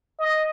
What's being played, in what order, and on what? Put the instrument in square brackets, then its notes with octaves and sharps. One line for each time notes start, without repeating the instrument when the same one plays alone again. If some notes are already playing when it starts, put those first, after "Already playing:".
[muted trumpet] D#5